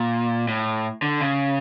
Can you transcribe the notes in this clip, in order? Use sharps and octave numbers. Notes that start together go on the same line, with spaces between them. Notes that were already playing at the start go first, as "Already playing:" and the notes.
Already playing: A#2
A2
D3
C#3